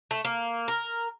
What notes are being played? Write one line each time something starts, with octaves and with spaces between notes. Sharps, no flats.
A3
A#3
A#4